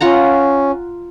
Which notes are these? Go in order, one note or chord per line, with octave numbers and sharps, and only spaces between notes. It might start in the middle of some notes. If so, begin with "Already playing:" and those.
C#4 F4 F#5 A#5